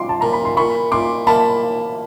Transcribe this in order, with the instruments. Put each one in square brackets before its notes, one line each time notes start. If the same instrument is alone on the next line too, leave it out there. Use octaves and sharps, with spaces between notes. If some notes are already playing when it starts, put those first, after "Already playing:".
Already playing: [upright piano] C6 D6
A5
[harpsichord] A#2 [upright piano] A#5
[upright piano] B5
C6
[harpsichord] A#2 [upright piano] B5 C#6
[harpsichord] A#2 [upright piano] C6 D6
[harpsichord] A#3 [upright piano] A5 B5